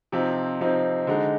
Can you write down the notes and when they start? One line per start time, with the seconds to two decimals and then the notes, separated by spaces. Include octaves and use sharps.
0.12 C3 F3 C4 D#4
0.61 C3 F3 C4 D#4
1.07 D3 G#3 D#4